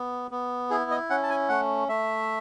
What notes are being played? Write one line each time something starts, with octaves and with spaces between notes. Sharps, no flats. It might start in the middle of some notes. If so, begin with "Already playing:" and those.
Already playing: B3
B3
E4 G#4
D#5
C#4 F#5
A5
G#5
A3 F#5
A3 E5